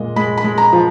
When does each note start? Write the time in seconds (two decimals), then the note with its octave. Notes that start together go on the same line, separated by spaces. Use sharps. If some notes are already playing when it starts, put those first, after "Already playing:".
Already playing: A#2 G#3 D#5
0.16 G#3 B5
0.38 B5
0.44 G#3
0.58 A#5
0.73 F3